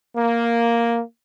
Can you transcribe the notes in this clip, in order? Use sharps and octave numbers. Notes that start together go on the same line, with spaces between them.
A#3